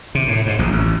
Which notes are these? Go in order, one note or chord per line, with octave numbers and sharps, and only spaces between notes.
C3
A2
G#2
A#1
A1